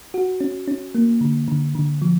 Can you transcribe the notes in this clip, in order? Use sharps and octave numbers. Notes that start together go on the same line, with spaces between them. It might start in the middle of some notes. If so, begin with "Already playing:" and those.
F#4
C#4
C#4
A#3
D3
D3
D3
F3